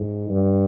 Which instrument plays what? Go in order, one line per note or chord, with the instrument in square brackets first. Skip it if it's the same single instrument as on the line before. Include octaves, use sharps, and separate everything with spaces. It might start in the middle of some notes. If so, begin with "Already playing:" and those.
Already playing: [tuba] G#2
G2